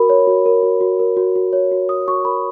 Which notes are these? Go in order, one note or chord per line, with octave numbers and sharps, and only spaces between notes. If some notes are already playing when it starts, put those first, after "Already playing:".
Already playing: F#4 A#4 B5
C#5
F#4
A#4
F#4
F#4
A#4
F#4
F#4
C#5
F#4
F#4 D#6
F#4 C#6
A#4 B5